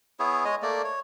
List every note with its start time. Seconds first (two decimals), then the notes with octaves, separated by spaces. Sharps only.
0.20 B3 E4 G#4 C#5
0.45 G#3 C#5 D#5
0.62 A3 A#3 D5
0.84 C#5